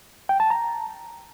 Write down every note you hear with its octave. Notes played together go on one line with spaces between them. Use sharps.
G5
A5
A#5